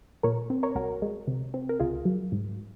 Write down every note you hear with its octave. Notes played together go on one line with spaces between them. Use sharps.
A#2 A#4 C#5
C4
A#4 C#5
C2 F#4 A#4
G#3
C3
C4
A#4
C#2 F4 G#4
F#3
G#2